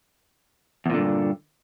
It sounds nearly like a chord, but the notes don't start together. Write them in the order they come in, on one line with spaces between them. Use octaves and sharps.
E2 A#2 D3 G2